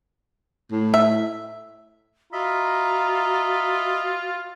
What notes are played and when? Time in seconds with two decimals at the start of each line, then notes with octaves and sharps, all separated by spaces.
0.72 A2
0.94 E5
2.33 F4 F#4 D#5 E5 A#5 B5